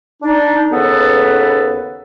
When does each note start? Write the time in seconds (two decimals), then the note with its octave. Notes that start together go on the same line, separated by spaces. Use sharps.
0.23 D4 D#4
0.72 D#2 C#3 B3 A4 B4